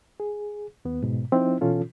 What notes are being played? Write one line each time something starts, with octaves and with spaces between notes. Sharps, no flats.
G#4
D#2 B3
G#2 B2
F3 C4 D#4 E4
B2 E3 C#4 F4 A4